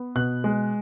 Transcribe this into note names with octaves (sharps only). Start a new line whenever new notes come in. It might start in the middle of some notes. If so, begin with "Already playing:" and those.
Already playing: B3
B2 F#6
G#3